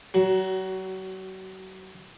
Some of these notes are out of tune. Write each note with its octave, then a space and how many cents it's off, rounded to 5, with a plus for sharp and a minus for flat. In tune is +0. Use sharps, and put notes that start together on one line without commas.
F#3 +35 F#4 +10